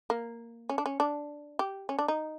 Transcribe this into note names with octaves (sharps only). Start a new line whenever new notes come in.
A#3
C#4
D4
C#4
D4
G4
C#4
D4
D#4